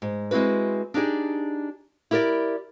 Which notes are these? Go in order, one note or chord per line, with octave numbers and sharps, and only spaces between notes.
G#2
G#3 C4 E4 F#4 B4
D4 D#4 G4 G#4
E4 G4 A#4 C5 D5